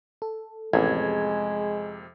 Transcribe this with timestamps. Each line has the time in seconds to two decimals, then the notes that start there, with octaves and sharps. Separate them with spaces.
0.22 A4
0.73 A1 F2 C3 G#3 G#4 G#6